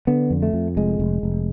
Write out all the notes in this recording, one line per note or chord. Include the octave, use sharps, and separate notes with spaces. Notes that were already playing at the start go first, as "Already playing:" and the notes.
D3 B3
F2
A3
F2
F1 G#3
F1
F1